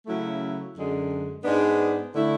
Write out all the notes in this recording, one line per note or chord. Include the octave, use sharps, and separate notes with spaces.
C#3 F#3 A3 C#4 E4
F#2 D3 G#3
G#2 G#3 B3 D4
D3 A3 E4